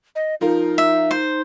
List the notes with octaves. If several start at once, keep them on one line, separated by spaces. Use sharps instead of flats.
D#5
F3 D#4 F4 A#4
E5
C5